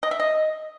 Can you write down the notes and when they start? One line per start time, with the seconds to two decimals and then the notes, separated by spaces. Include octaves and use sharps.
0.03 D#5
0.11 E5
0.20 D#5